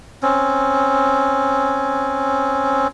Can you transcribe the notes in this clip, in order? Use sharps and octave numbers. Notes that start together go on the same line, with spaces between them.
C4 C#4